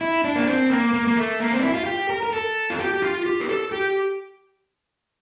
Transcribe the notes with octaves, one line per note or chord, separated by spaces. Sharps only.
E4
D4
A#3
C4
A#3
A#3
A#3
A3
A#3
C4
D4
E4
F4
G4
A#4
A#4
A4
F4
G4
G4
F4
G4
A#4
A4
G4